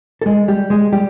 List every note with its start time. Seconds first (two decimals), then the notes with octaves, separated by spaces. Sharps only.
0.21 A4
0.26 G#3 G#4
0.48 G3 G4
0.70 G#3 G#4
0.92 G3 G4